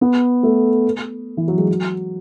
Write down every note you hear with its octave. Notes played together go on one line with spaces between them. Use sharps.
B3
A3
E3
F#3
G#3
F#3